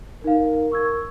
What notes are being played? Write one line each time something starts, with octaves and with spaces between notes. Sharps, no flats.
D#4 A#4 F5
C#6 E6 G#6